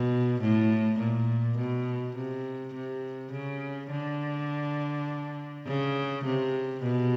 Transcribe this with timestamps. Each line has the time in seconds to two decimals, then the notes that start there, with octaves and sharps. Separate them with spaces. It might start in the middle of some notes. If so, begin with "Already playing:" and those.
Already playing: B2
0.41 A2
0.99 A#2
1.57 B2
2.16 C3
2.74 C3
3.32 C#3
3.91 D3
5.66 C#3
6.25 C3
6.83 B2